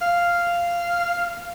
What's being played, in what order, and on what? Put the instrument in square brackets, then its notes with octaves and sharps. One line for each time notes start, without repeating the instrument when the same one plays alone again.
[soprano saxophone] F5